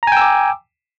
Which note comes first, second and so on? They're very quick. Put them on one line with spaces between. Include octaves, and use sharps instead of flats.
A#5 G#5 G5 E6 D6